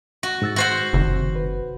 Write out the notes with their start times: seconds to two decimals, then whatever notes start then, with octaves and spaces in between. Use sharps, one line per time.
0.23 F#4
0.42 G#2 E6 A6
0.56 F#4 C5 F#5
0.93 F#1 C3 D#3
1.36 B4